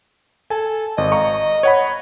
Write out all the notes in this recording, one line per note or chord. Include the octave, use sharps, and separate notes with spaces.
A4 G#5
G#1 D#5
F5 A#5 C#6
C#5 F#5 B5